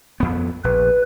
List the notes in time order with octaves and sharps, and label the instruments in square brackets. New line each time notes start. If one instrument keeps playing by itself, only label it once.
[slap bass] F2 B3
[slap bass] A#1 [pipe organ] B4